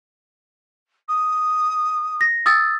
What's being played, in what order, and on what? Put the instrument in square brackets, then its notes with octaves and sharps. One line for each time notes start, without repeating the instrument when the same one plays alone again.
[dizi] D#6
[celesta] A#6
D#6 E6 A6